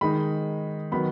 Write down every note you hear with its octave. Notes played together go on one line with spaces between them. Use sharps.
D#3 G#3 D#4 B5
D#3 F#3 B3 B5